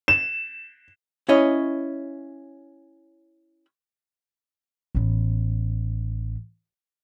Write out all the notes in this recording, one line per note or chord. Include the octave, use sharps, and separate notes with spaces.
E7
C#4 E4 C#5 D#5
A1 B3